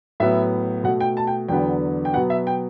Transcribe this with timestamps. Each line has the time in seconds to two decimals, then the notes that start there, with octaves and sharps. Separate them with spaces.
0.20 A2 F#3 B3 E5
0.84 B2 A3 F#5
1.01 G5
1.17 A5
1.27 G5
1.48 E2 D3 F#3 B3 G5
2.05 G5
2.13 B2 F#3 B3 F#5
2.30 E5
2.47 G5